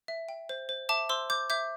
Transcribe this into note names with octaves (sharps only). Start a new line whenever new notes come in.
E5
G5
C5
C5
E5 A5 D6
C5 C6 E6
C5 D6 G6
E5 D6 G6